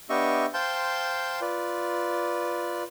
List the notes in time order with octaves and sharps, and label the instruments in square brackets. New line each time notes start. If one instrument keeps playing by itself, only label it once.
[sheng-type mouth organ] B3 D4 G4 D#5 E5 C#6
C5 F5 G5 A5 C6 G6
F4 B4 D5